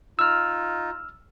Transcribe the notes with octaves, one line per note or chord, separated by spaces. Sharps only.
D#4 F4 E6 F6